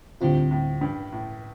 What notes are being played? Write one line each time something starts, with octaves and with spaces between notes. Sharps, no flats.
D2 A2 D3 G3 C4 F4
A2
G2
A2